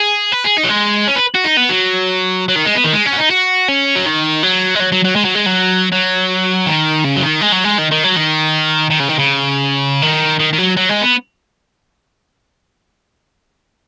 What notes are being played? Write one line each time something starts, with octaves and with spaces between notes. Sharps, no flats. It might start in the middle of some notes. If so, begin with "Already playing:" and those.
Already playing: G#4
B4
G#4
D#4
F#3
G#3
C#4
B4
F#4
D#4
B3
F#3
F#3
D#3
G#3
B3
D#3
G#3
C#4
F#4
D#4
F#4
C#4
F#3
D#3
F#3
G#3
F#3
F#3
F#3
G#3
F#3
G#3
F#3
F#3
D#3
C#3
F#3
D#3
G#3
F#3
G#3
D#3
D#3
F#3
D#3
D#3
C#3
D#3
C#3
D#3
D#3
D#3
F#3
F#3
G#3
B3